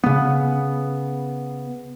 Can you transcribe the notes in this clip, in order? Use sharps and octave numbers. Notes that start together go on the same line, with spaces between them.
C#3 B3